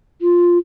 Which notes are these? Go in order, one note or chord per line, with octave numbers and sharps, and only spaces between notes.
F4